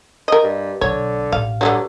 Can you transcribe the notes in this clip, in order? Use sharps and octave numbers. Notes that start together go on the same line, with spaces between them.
A#4 D#5
G2
B1 D3 C#5
A1 F5
G2 D3 E3 F#3